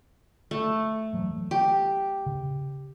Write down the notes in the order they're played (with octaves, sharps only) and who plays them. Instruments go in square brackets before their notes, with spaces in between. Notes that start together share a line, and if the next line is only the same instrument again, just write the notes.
[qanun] A3
[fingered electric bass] E3 F#3 A#3
[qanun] G4
[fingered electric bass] C#3